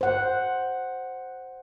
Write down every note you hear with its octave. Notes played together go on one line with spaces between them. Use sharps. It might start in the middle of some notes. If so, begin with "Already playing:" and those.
C5 F#5